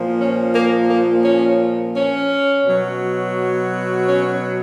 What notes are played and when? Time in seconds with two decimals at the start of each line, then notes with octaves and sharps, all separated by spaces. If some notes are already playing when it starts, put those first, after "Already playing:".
Already playing: A#2 F3
0.17 C#4
0.53 A#3
0.88 A#3
1.23 C#4
1.94 C#4
2.65 B2 F#3
4.08 C#4